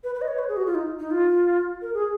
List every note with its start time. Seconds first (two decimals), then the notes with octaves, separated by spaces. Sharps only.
0.04 B4
0.15 B4
0.21 D#5
0.28 C#5
0.39 B4
0.49 G#4
0.57 F#4
0.66 F4
0.75 D#4
0.99 D#4
1.11 F4
1.82 A#4
1.94 G#4